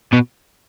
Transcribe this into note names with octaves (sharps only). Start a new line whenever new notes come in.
B2